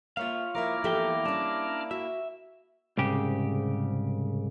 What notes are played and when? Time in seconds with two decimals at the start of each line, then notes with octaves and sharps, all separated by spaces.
0.17 A#3 F4 C#5 E5 F5
0.55 F3 A#3 E4 A#4 E5 A#5 D6 F6
0.84 E2 F3 G4 A4 E5 G5
1.25 G3 C#4 D4
1.91 F#4 E5
2.97 C2 G#2 C#3 G4